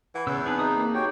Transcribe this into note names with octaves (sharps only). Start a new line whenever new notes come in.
E3 F#5 B5
E2 C#3 E6
C4 D#4 G#4 B4 A5
D#4 G#4 B4 D#6
A#3
F#4 G4 C#5 G5